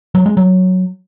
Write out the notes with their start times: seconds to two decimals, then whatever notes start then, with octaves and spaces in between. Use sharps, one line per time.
0.15 F#3
0.26 G#3
0.37 F#3